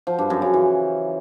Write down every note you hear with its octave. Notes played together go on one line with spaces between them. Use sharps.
F3
G2
F#2
C#3
E3